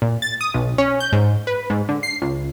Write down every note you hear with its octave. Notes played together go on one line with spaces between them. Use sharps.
A#2
A6
D#6
B1
C#4
G6
G#2
B4
G#2
D3
C7
C#2